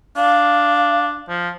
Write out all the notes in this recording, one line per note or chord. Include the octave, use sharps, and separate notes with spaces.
D4 F5
F3